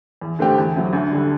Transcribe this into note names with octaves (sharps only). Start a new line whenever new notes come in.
E2
D3 A3 C4 G4
E2
C3 F#3
D2
D3 G3